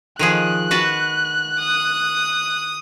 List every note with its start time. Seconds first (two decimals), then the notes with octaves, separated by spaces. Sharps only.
0.19 D#3 F3 G#4 F#6
0.71 F#4 B4 A5
1.59 D#6